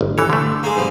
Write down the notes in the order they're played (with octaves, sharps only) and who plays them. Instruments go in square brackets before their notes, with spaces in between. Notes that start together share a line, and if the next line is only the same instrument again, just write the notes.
[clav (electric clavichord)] G1
[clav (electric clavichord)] E3 C#5 [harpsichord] A4
[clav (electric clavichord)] D3 A3
[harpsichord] G#3 A#3
G2 B2 F3